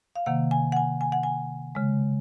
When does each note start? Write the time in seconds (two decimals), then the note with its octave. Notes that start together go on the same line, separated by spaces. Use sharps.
0.16 F5
0.26 C3 D#3 A#3 F#5
0.51 G#5
0.72 F#5
0.76 G#5
1.01 G#5
1.12 F#5
1.23 G#5
1.75 C#3 G#3